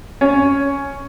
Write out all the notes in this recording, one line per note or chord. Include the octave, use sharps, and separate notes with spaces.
C#4